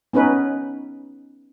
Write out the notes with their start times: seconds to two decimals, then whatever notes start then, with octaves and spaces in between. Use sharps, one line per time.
0.13 B3 C#4 D#4 B4